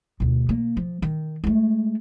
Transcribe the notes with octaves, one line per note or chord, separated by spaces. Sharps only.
D2 B2
A#3
F3
D#3
G#3 A3